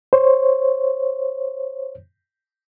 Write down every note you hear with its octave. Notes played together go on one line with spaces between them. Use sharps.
C5 C#5